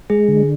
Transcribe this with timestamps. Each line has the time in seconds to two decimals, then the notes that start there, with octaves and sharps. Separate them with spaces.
0.10 G#3 G#4
0.29 D3